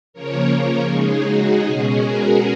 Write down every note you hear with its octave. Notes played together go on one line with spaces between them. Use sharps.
C#3 F3 A#3 A#4 C#5
A#4 C#5
C#3 G#3 D#4 G#4
F#4
B2 G#3 C#4 G#4
F#4 A#4